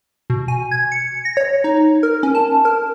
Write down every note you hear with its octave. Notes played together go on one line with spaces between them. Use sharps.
B2
G#5
G#6
C#7
A#6
C#5
D#4
A#4
C#4
A5
A#4